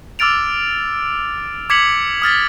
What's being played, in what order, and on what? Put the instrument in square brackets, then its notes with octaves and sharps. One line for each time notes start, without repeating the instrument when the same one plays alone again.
[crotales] D6 E6 F6 A6 D7 F7
D6 G#6 B6 C#7 F7 F#7
D#6 F6 A6 B6